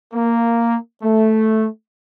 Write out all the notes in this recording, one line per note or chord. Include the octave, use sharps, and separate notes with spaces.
A#3
A3